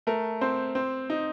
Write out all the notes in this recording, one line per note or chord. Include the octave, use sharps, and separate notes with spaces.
A3 A#4
C4 C5
C4
D#4